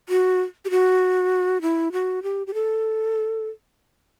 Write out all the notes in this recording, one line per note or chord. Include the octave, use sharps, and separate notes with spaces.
F#4
G4
F#4
E4
F#4
G4
G4
A4